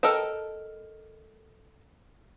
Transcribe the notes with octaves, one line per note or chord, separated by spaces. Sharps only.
A4 A#4 D#5 G5 A5